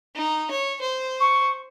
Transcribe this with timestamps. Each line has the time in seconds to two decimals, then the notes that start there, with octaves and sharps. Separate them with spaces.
0.15 D#4
0.51 C#5
0.81 C5
1.20 C#6